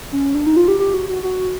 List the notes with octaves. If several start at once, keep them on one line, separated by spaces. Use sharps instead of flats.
C#4
D4
D#4
F4
G4
G4
F#4
F#4
F#4